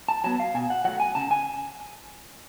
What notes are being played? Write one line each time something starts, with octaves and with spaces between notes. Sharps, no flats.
A5
F#3 B3 A5
F5
B2 G#5
F#5
F#3 A3 F#5
G#5
C#3 A5
G#5